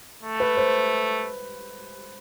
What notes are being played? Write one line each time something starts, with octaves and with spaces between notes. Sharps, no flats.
A3
B4
C5